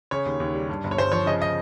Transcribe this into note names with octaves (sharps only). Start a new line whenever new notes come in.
C#3 C#5
D#2
D#2
G3
G2
G1
C#5
G1 C5
F3 C#5
C#3 D#5
D#5